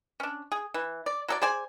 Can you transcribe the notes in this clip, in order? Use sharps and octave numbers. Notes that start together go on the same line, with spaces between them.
C#4 D4
G#4
E3
D5
F#3 A4 D5
G#4 C5 D5 G#5